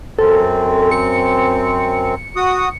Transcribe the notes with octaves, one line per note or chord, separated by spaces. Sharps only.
F#2 C4 A4
C#7
F#4 D#6